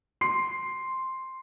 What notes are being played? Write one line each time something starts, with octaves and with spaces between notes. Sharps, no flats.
C6 C7